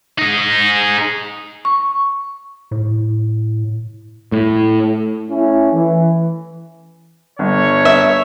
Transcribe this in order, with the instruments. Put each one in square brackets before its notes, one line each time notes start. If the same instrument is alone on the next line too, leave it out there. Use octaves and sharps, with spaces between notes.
[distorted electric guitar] D#4 G#4
[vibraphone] C#6
[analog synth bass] A2
[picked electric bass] A2
[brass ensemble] A3 C#4 E4
E3
[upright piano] G1 [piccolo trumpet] C#5
[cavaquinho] E5